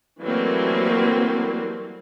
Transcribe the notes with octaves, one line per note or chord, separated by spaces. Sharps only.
E3 F#3 G3 A3 A#3 C4